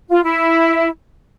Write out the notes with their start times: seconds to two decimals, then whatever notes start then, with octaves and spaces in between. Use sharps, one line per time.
0.10 F4
0.24 E4